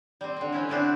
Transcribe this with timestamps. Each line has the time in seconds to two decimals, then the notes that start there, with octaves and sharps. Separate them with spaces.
0.21 G3 C4
0.36 D3 C4
0.52 E3 C#4 E4
0.69 D3 B3 C4 D4 E4